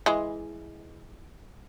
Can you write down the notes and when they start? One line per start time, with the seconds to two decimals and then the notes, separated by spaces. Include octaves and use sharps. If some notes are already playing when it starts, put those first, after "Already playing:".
0.06 E3 G#3